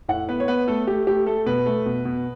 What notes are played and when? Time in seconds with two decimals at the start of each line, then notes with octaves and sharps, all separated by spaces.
0.09 A2 F#5
0.29 B3 B4
0.40 C#5
0.48 B3 B4
0.68 A3 A4
0.87 A3 G4
1.07 A3 G4
1.26 A3 A4
1.46 B2 B4
1.66 A3
1.86 B2
2.05 B2